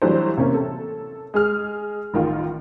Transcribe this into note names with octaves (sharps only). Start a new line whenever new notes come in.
E3 F#3 G3 A3 D4 C5
C3 A#3 C#4
A4
G#3 G#4 F6
A1 D#3 F4